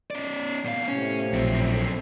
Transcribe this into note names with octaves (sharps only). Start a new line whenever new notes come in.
C#4 D5
B2 F5
A2 C3 C#4
A#1 F#2 C4